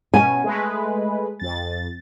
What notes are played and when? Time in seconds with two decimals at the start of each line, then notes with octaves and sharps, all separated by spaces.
0.14 B2 C#4 G#5
0.44 G#3 A3 B4
1.40 F2 A6